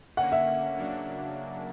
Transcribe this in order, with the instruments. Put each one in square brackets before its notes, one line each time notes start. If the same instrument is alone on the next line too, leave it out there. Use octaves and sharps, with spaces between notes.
[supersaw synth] D3 A#3 C#4 [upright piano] F#5
[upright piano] E5
[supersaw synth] C#3 F#3 A#3 D4